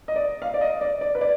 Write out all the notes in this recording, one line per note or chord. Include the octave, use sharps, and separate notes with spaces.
D#5
D5
F5
D5
D#5
D5
D5
B4
D5